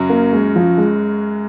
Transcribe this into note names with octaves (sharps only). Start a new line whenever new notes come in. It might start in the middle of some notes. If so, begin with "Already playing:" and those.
Already playing: F#2 C#3 F#3
A#3
G#3
F3
G#3